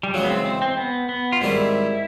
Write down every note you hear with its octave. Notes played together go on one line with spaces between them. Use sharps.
G3
C#3 E3 F#3 G#3
B3
C4
C4
C4
B3
B3
F4
G#2 D#3 G3 C4 E4